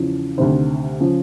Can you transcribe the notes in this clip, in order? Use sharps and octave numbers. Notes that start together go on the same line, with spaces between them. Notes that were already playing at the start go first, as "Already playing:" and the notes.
Already playing: E2 C#3 F3
D2 C3 D#3 C5
C#3 F3